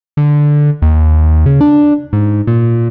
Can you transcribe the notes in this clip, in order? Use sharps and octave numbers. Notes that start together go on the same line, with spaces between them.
D3
D#2
C#3
D4
G#2
A#2